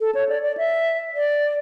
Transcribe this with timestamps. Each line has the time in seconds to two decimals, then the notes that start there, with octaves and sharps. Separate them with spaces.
0.01 A4
0.15 C#5
0.29 D5
0.43 D5
0.57 E5
1.15 D5